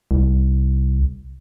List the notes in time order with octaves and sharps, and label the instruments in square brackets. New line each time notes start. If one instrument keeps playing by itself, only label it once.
[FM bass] C2